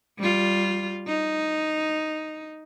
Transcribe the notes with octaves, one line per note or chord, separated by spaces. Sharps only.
G3 F4
D#4